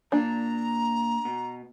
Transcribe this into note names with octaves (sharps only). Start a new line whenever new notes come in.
A#2 D4 A#5
B2